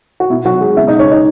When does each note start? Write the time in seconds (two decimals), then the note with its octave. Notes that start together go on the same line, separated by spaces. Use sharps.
0.20 F#4
0.30 B2 E4
0.45 F#3 F#4
0.53 B2
0.61 G#3 G#4
0.76 C#3 E4 E5
0.87 D#4 D#5
0.99 C#3 C#4 C#5
1.11 D#4 D#5